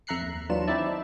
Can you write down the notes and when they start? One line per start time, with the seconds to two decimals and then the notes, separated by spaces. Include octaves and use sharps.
0.07 F2 E5 A#5 F#6 C7 C#7
0.22 D#2
0.49 D#2 E3 F#3 D4 F4 E7
0.67 C4 D#4 E4 D5 E5 A5